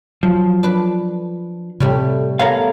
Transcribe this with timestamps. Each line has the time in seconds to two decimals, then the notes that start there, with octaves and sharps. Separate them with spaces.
0.23 F3 F#3
0.63 D4 B4
1.80 A2 C3 G3 A3
2.39 A3 B3 A#4 C#5 F5